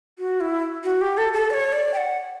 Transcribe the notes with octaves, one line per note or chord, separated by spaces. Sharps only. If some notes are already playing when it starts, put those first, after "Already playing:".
F#4
E4
F#4
G4
A4
A4
D5
C#5
D5
G5
F#5